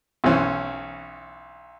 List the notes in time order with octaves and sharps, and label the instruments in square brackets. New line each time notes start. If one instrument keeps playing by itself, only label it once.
[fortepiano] B1 E3 C#4 C5